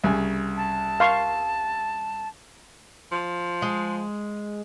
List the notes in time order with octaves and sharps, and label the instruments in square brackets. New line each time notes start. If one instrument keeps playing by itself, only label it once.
[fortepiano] C2 C#3 G#5
[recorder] A5
[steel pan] F5 C6 C#6
[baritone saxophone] F3
[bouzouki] G#3